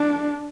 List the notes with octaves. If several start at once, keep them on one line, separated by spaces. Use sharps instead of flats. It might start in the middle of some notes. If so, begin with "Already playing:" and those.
Already playing: D4